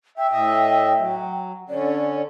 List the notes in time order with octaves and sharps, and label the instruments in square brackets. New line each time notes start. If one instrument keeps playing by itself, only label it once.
[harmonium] E5 [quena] G5
[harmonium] A2 D#5 E5
F#3
[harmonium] D3 C#4 [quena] D5